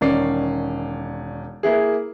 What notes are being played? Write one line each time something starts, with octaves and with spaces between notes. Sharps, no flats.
E1 D#3 C#4 D5 C7
A#3 E4 G#4